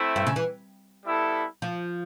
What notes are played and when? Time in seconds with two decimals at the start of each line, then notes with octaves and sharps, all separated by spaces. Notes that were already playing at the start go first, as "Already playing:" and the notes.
Already playing: A3 C4 E4
0.16 G2
0.27 C#3
0.36 E3
1.04 G3 B3 E4 A4
1.62 F3